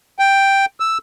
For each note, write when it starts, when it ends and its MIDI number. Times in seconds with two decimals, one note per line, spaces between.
0.19 0.65 79
0.80 0.98 88